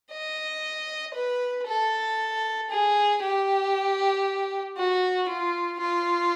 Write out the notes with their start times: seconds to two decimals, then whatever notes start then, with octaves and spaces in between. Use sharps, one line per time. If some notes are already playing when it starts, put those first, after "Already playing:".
0.12 D#5
1.15 B4
1.67 A4
2.70 G#4
3.22 G4
4.77 F#4
5.29 F4
5.81 F4